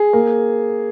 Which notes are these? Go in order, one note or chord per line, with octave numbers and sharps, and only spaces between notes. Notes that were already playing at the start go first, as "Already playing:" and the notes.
Already playing: G#4
A#3